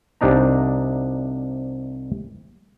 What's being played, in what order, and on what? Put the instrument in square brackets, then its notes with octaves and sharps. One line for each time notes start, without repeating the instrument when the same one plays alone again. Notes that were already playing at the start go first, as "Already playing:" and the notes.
[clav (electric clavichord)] C2 C3 D4 D#4 A#5